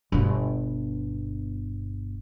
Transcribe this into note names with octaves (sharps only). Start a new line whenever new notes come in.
G1 B2